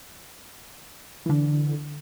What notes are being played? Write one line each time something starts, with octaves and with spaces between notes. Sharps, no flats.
D3 E3